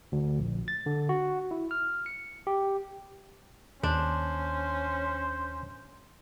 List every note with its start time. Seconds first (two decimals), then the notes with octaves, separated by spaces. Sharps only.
0.12 D2
0.39 A#1
0.68 A6
0.86 D3
1.09 F#4
1.51 E4
1.71 F6
2.06 C#7
2.47 G4
3.83 D#2 C#4 D4 C5